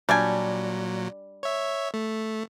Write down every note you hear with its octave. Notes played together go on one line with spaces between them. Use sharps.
A#2 F#3 G3 D4 G#5
C#5 E5
A3